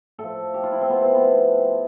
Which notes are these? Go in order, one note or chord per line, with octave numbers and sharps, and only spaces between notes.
A2 F3 A4
G4
F4
E4
C4
B3
C4
B3